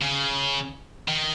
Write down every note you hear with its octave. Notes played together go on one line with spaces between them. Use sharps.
C#3
D#3